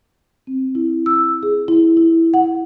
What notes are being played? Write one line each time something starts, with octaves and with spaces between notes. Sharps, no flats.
C4
E4
E6
G#4
E4
E4
F#5